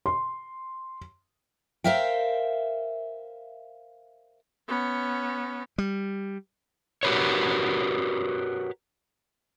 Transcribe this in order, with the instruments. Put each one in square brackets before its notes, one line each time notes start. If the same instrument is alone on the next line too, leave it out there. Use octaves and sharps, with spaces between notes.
[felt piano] C6
[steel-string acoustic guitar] A#4 C5 E5 F5 G5
[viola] B3 C#4
[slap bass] G3
[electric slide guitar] F#4 G4 A#4 B4 C#5